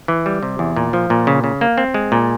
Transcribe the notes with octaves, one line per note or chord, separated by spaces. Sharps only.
E3
G3
C3
E2
A#2
F3
A#2
C#3
C#3
A#3
C4
G#3
A#2